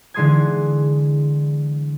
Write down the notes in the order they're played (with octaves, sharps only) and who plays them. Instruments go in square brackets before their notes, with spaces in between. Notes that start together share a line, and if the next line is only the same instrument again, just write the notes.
[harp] D3 E3 G#3 C6 D#6 G#6